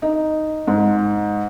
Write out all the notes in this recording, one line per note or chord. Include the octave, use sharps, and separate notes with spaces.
D#4
G#2